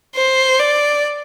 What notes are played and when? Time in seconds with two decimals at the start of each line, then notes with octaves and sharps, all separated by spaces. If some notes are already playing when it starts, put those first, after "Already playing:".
0.15 C5
0.59 D5